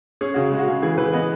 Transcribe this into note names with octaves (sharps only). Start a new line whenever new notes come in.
C#4 G#4
C#3 F#4
G#3
F#4
C#3
E3 G#4
E3 B4
B3 D#5